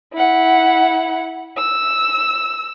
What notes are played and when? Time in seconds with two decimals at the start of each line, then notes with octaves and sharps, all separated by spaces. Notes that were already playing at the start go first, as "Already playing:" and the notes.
0.14 E4 F#5
1.58 E6